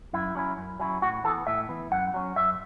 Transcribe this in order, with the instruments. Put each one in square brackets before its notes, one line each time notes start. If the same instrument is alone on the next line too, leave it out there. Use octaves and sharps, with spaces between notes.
[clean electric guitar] F#2 E4
F#3 C#4 E4
F#2
F#3 C#4 E4
A2 F#4
E3 A4
B3
A2 E5
E3 B3
F#2 F#5
F#3 C#4
F#2 E5